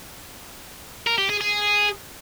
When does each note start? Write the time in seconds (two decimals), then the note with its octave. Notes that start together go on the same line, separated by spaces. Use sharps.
1.07 A#4
1.18 G4
1.29 G#4
1.41 G#4